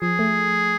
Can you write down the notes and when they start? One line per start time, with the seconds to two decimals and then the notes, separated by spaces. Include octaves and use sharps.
0.02 F3 G#4
0.19 A3